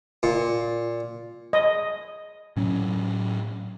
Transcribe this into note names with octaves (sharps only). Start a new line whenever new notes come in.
A#2
D#5
A2 F#3 C#4